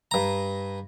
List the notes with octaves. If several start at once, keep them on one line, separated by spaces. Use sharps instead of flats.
G2 A#5